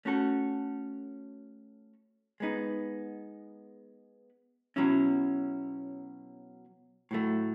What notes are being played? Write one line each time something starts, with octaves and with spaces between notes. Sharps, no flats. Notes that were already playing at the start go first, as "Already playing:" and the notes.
A3 C#4 F#4 A4
G#3 B3 D#4
B2 F#3 C#4 E4
A2 F#3 A3